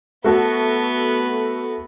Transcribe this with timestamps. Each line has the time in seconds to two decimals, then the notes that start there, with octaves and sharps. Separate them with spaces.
0.24 A3 B3 F#4 A4